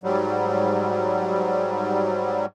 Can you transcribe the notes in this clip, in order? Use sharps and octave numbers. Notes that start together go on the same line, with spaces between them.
G#2 F#3 G3